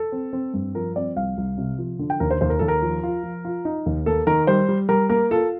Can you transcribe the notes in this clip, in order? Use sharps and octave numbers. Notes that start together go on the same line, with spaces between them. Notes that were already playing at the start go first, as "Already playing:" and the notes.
Already playing: A4
C4
C4
G2
F3 A#4
C4 D5
C2 F5
C2
C3
F3
D3
G5
D#2 A#4
C5
D#2 C5
A#4
D#2 A4
A#4
F3
F4
F3
F4
D#4
D#2
A#3 A4
D#3 A#4
G3 C5
G3
G3 A#4
A#3 A#4
F4 A4